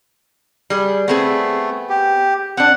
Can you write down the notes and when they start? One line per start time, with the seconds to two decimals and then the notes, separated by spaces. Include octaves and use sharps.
0.70 G3 G#4
1.08 A3 B3 C4 G#4
1.89 G4
2.57 C4 D4 F#5